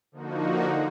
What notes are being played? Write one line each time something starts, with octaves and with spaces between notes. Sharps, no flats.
D3 F3 A#3 D#4 F#4